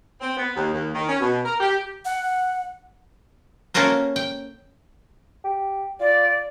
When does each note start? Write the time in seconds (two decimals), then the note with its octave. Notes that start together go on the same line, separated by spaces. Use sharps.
0.21 C4
0.37 B3
0.56 D#2
0.74 D#2
0.95 D#3
1.08 C#4
1.21 B2
1.44 A#4
1.60 G4
2.05 F#5
3.74 A#3 C#4 F#4 A4 A#4 C5
4.16 G5
5.44 G4
6.00 F4 D5